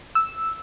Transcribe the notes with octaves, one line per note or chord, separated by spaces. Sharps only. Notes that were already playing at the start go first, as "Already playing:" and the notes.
E6